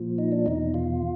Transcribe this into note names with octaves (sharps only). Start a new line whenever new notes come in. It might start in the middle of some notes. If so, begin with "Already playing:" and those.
Already playing: A#2 F3
D#4
D4
E2 B2 D#4
F4